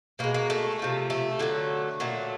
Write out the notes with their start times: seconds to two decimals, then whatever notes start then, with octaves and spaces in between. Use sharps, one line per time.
0.19 B2 G#3 A#3
0.34 A#3
0.50 A3
0.79 C3 F3 A3
1.10 A3
1.39 D3 F#3 A3
2.00 A#2 F#3 A3